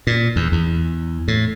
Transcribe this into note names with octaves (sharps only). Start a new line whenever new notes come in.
A#2
E2
E2
A2